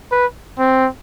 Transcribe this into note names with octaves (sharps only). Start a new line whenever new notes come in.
B4
C4